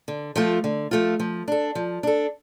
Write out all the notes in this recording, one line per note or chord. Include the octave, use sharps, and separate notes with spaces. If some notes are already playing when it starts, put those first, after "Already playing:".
D3
F3 A3 F4
D3
F3 A3 F4
F3
D4 A4
F3
D4 A4